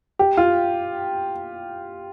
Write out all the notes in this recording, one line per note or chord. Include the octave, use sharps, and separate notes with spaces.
G4
F4